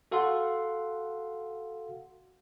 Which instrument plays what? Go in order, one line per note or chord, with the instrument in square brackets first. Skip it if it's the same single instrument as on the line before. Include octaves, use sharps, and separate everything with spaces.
[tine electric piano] F#4 A4 F5 F#5 C6